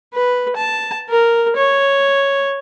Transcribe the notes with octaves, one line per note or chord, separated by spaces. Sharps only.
B4
A5
A#4
C#5